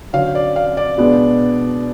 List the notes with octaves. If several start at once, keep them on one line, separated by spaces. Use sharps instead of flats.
D3 F#3 C#4 F5
D5
F5
D5
B2 G#3 B3 D4